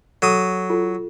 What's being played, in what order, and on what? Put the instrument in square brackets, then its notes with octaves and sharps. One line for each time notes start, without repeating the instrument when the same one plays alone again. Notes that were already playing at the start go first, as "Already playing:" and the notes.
[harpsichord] F#3 D#6 [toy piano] A4
[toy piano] F4 A4